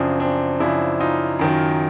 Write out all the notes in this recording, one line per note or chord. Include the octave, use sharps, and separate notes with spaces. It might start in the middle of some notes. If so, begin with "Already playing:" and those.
Already playing: F#2 C#3 F3 C4 D4
C4 D4
F#2 C#3 F3 D4 E4
D#4 F4
F#2 D#3 F#3